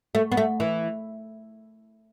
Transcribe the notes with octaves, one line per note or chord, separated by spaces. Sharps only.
A3
B3
A3
E3